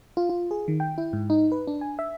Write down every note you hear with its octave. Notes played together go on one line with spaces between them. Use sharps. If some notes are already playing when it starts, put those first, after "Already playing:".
F4
F4
G#4
D#3
G5
E4
G#2
D#4
B4
D4
G#5
E5